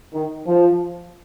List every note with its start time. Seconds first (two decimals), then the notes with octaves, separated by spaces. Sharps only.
0.14 D#3
0.47 F3